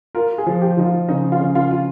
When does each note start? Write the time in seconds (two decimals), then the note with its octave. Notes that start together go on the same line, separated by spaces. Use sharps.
0.15 F4 A#4
0.38 G#4
0.46 F3
0.62 G4
0.77 F3 D#4
0.85 F4
1.09 C#3 D#4
1.32 F4
1.40 C#3
1.55 F4
1.71 F4